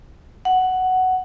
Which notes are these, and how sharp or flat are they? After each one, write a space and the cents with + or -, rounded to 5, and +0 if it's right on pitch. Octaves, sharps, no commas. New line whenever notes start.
F#5 +5